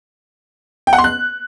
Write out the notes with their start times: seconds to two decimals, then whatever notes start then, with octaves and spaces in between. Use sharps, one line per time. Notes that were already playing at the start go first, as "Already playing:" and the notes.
0.87 G5
0.93 F#5
0.98 C6
1.04 F#6